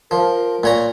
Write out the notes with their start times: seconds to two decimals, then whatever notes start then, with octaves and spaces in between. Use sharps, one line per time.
0.11 F3 A#4
0.64 A#2 C#5 A#5